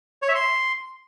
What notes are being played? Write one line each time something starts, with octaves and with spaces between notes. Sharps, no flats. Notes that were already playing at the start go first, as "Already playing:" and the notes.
C#5
E5
C6